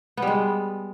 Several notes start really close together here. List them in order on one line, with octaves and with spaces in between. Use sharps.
B3 G3 G#3